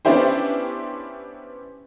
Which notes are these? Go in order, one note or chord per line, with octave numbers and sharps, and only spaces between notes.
B3 C#4 D4 E4 G4 C5